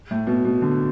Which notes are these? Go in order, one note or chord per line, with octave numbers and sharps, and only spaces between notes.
A2
B2
B2
D3